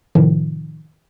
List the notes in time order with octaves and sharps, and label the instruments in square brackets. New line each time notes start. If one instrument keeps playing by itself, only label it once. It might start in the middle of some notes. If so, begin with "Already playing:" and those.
[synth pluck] A2 C3 D#3 F3